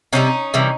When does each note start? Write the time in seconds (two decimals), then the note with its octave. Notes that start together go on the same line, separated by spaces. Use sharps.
0.13 C3 E3 G3 C#4 D#4
0.54 C3 E3 G3